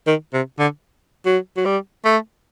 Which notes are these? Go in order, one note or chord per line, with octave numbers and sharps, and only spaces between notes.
D#3
C3
D3
F#3
F#3
G3
A3